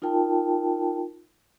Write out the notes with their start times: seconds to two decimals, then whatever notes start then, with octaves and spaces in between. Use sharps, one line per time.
0.02 D#4 F4 A#4 G5 A5